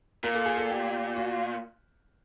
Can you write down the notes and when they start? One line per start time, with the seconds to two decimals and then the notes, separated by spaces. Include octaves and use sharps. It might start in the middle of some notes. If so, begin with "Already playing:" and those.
0.23 A#2 A#4
0.35 A4
0.46 G#4
0.57 A4
0.70 G4
1.16 F#4